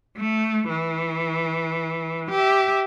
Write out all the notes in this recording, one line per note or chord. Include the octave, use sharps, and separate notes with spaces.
A3
E3
G4 E5